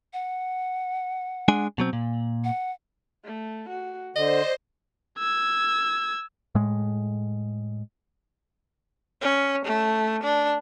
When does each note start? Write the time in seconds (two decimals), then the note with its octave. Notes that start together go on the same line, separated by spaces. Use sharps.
0.13 F#5
1.48 G#3 D4 G#5
1.78 B2 F#3 C4
1.93 A#2
2.44 F#5
3.25 A3
3.69 F#4
4.16 D3 C5 D5 D#5
5.19 E6 G#6
6.55 A2 G#3
9.22 C#4
9.65 A3
10.23 D4